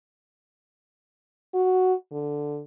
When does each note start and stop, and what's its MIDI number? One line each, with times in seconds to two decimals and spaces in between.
1.54 1.94 66
2.12 2.62 50